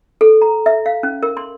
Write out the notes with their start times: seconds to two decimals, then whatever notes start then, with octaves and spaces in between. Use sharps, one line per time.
0.21 A4
0.42 A#5
0.66 E5
0.86 F5
1.03 C#4
1.23 A#4
1.37 C6